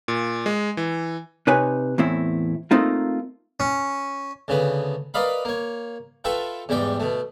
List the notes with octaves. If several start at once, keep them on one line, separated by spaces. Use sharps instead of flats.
A#2
G#3
E3
C3 D#4 B4 C#5 G#5
E2 A2 C4 E4
A3 A#3 C4 D#4 F4
C#4
D2 C#3 B3 B4
A#4 B4 D5 D#5 F5 B5
A#3 C#5
F4 A4 B4 E5 G5 C#6
E2 G#2 G3 D5 G5
B2 A3